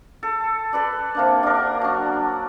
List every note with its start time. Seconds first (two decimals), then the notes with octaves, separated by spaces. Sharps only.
0.23 A4
0.73 A4 B4 D5
1.15 C3 A#3 D4
1.43 D4 A#4
1.55 F#5
1.81 F#3 D4